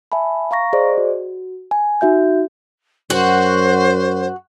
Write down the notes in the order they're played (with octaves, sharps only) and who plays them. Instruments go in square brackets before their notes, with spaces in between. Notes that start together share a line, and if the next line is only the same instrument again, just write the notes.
[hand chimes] E5 G#5 A5 B5
F5 A#5 C#6 A#6
G#4 C5 D5 D#5
F#4
G#5
D#4 F#4 E5 G6
[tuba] F#2 [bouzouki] F#4 [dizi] C5